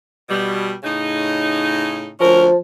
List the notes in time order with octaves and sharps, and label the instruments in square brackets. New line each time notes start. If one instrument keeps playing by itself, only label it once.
[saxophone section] B2 G3
A2 C#3 D#4
[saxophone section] D2 C#4 A#4 [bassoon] F3